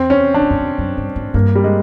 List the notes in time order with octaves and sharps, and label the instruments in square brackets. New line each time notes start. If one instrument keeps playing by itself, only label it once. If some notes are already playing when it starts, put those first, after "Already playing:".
Already playing: [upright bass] E2 [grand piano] C4
[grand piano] C#4
D4
[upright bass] G2
F#2
F2
F#2
G2
G#2
[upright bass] G2 [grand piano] A#3
[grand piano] G3
G#3